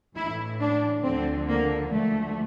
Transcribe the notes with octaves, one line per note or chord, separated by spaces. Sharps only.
A2 E3 E4
D4
D2 D3 F3 C4
A#3
D2 D3 F3 A3